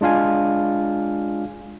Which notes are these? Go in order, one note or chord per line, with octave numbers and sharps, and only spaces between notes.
G#3 D4 F4 F5 G#5